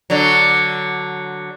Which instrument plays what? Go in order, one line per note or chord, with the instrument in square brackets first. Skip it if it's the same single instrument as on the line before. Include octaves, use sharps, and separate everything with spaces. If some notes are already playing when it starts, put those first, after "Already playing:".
[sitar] D3 F#3